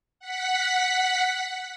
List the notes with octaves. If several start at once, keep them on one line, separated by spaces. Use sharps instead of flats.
F#5 B6